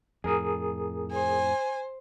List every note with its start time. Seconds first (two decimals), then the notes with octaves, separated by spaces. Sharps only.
0.24 F2 A2 G#4 A#4 D#6
1.12 C5 G#5